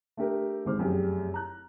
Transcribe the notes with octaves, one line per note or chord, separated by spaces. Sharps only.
A3 D4 G4 A#4
G#1 G#3 C5 D6 F6
F1 F#2 G4 G#4
A#5 F#6